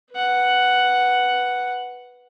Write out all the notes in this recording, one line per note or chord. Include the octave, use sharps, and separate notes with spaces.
B4 F#5